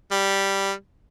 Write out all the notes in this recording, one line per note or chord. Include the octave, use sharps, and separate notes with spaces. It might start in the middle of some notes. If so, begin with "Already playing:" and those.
G3